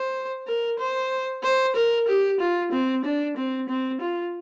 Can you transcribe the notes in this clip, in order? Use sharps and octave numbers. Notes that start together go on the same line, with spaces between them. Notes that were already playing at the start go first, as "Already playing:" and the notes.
Already playing: C5
A#4
C5
C5
A#4
G4
F4
C4
D4
C4
C4
F4